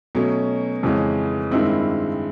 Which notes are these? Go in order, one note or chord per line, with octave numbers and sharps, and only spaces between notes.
B2 F#3 A3 C#4
F2 C#3 E3 G#3 C#4
G2 D#3 G#3 C4 E4